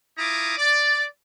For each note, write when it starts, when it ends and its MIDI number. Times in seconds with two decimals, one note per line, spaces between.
0.18 0.57 64
0.18 0.57 65
0.18 0.57 82
0.18 0.57 86
0.18 0.57 87
0.58 1.06 74